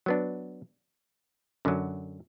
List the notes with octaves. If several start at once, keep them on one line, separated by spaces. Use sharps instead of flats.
F#3 B3 D4
F#2 D3 F#3